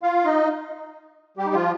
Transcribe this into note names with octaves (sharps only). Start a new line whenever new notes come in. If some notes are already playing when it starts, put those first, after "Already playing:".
F4 F5
D#4 D#5
G3 G4
D#4
F3 F4